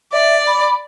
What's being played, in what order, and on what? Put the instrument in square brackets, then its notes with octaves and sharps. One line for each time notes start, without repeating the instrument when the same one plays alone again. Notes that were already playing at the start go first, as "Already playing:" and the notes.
[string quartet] D5 [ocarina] E5
[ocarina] B5